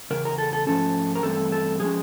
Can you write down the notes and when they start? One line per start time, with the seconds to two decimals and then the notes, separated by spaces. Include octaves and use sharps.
0.11 E2 C#3 A#4
0.25 A#4
0.38 A4
0.53 A4
0.67 G#2 F3 A3 C#4 A4
1.15 A#4
1.23 G2 E3 A3 C4 A4
1.52 A4
1.80 D3 F3 G#3 C#4 G#4